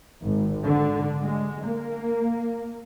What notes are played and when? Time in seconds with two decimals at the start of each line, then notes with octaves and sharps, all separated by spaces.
0.24 G#1
0.65 D3
1.24 G#3
1.67 A#3